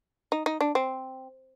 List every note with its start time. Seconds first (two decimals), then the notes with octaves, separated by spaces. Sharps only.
0.32 D#4
0.46 D#4
0.61 D4
0.75 C4